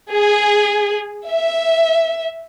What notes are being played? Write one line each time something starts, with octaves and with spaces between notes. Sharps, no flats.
G#4
E5